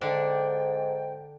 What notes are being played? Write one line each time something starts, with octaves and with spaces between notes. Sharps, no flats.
G#2 D3 D4 D5 G5